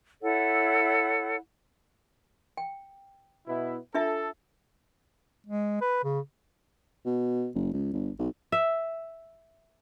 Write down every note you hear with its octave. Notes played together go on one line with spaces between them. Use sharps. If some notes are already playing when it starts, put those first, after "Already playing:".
E4 A4 C#5 F#5
G5
B2 B3 E4
D4 F4 A4 E5
G#3
B4
C#3
B2
F#1
C#2
G1
B1
E5